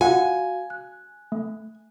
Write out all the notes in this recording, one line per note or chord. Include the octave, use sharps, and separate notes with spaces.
F4 F#4 F5 F#5 G#5
F#6
A3